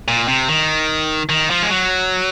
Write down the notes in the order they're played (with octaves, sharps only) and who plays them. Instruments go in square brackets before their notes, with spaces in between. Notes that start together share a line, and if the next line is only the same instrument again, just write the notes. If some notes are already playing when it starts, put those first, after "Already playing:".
[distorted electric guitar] A#2
C3
D#3
D#3
F3
G#3
F#3